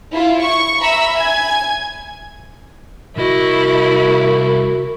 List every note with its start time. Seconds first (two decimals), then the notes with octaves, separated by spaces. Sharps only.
0.11 E4 F4
0.42 C#6
0.82 E5 A#5 B5 E6
1.18 G#5 G#6
3.17 C2 E4 F#4 A#4 D#5